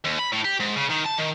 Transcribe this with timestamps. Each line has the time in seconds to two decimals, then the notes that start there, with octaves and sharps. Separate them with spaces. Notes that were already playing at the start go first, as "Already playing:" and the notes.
0.04 D#2
0.19 B5
0.32 A2
0.45 G4
0.60 G#2
0.76 C#3
0.89 D#3
1.05 A5
1.18 D#3